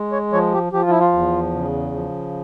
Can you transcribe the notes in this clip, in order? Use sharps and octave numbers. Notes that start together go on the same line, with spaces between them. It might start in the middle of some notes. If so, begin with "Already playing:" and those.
Already playing: G#3
C#5
F3 C#5
G4
F3 G4
F4
E4
F4
E2
C#3
F3